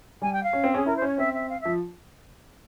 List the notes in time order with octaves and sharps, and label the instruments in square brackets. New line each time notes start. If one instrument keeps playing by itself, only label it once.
[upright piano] G3 [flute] G#5
[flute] G5
F5
[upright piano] C#4
C4
[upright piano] C#4 [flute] G#4
[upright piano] E4 [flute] A#4
[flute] C5
[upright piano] C#4 [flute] C#5
[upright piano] C4 [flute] E5
[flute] E5
F5
[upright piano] F3 [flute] E5